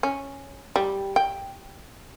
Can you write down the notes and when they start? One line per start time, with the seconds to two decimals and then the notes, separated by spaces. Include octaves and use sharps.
0.03 C#4
0.76 G3
1.16 G5